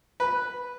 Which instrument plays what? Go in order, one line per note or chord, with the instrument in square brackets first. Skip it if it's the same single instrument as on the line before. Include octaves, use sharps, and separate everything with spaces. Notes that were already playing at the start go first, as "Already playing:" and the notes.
[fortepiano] B4